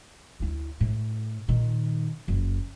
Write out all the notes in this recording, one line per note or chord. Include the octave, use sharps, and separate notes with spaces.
D2 E4
A2
A#2 D#3
F#1